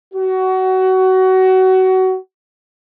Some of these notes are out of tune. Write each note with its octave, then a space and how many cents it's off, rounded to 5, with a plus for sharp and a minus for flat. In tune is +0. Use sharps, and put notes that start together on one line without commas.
F#4 +25